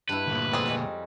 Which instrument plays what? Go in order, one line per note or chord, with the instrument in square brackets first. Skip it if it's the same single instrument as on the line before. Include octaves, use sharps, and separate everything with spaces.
[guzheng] G2 E4 [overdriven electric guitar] B4
[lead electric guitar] D2 A#2
[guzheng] F2 [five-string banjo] G3 C4 G#4
[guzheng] C#5 D#5 G#5